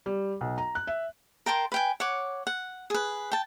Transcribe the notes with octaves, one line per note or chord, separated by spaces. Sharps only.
G3
B1
A#5
F#6
E5
A#4 G5 A5 C6
B4 G5 G#5
C#5 F#5 D6
F#5
G#4 B4
G5 A5